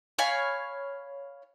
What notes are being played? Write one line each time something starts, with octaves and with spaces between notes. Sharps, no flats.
C#5 F5 G#5 B5